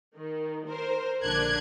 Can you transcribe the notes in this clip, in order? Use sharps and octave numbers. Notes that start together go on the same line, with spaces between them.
D#3
A#4 C5
A#1 D3 D4 F#6 G#6